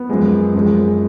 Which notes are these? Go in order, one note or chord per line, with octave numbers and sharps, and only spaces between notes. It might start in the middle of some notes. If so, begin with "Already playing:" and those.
Already playing: B3
F#2 F3 G#3
F#2 F3 G#3